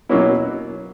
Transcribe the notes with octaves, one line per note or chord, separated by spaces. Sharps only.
B2 F#3 A#3 C#4 E4